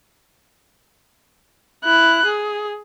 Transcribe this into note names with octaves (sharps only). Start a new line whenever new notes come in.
E4 F#6
G#4